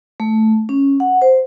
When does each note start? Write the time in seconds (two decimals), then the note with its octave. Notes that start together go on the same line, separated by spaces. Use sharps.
0.20 A3
0.69 C#4
1.00 F#5
1.22 C5